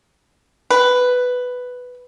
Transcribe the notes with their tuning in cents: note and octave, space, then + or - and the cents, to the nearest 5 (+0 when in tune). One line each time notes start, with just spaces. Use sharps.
B4 +5